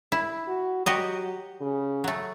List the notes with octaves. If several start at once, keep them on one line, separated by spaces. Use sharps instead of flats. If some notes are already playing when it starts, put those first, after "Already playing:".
E4
F#4
F#3 F#4 G4 D#5
C#3
F#3 A3